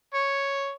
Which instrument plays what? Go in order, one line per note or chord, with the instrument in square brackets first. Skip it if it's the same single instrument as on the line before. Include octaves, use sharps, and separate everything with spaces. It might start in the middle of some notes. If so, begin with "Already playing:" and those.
[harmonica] C#5